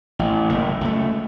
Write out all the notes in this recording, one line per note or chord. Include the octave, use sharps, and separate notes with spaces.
A1
F#1 A2
C#2 A3